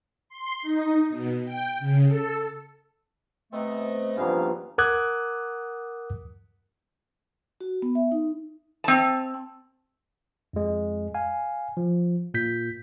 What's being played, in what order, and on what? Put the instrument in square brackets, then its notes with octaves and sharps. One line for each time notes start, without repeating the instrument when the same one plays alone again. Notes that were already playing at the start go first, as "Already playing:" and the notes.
[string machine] C6
D#4
B2
G5
C#3
A4
[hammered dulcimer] C3 B3 C4 [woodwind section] A3 [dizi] D#5
[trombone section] G2 F3 B3 [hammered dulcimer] C#3 E3 A#3 [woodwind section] F5
[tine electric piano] A#4 F#5 D6 D#6 F#6 G#6
[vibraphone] F#4
B3
E5
D#4
[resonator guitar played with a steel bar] C4 A5
[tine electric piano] F2 G#3
F5 G#5
F3
A#2 G6 B6